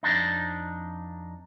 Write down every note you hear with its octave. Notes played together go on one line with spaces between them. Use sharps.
F2 D4 D#4